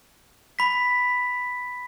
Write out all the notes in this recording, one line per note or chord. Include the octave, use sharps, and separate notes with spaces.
B5 B6